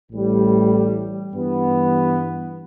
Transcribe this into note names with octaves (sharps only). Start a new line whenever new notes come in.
A1 A2 G3
G2 E3 B3